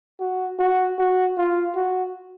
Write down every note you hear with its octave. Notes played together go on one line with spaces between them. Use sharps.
F#4
F#4
F#4
F4
F#4